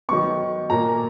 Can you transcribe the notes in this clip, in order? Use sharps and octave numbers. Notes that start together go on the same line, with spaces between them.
D#3 F#3 B3 C#6
A#2 A#3 A#5